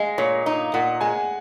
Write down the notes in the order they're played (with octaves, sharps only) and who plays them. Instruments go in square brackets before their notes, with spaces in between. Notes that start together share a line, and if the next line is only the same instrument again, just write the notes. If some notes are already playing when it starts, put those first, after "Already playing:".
Already playing: [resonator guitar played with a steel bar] G#3 [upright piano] D#5 F5
[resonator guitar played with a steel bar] A#2 [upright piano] C#5
[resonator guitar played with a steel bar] D#4
[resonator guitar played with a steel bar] A#2 [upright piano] F#5
[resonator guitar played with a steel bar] G#3 [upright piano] G#5